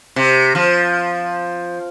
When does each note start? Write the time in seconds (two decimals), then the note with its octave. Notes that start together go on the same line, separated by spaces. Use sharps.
0.16 C3
0.55 F3